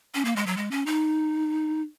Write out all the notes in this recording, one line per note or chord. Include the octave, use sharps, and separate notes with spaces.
C#4
A#3
G#3
F#3
G#3
C#4
D#4